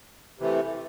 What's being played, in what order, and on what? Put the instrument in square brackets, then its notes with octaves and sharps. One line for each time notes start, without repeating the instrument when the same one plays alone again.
[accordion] C3 E3 A3